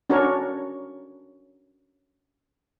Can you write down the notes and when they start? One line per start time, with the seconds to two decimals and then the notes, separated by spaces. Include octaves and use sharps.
0.10 C#4 D4 F#4 A#4 C#5